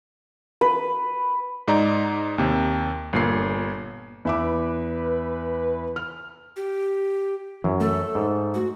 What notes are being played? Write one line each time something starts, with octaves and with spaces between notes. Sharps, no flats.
B4
G#2 D#4 D5 A#5
D#2 C3
G1 A#2 C7
E2 B4 E5 D6
F6
G4
F#2 E3
A3 A4
G#2
F#4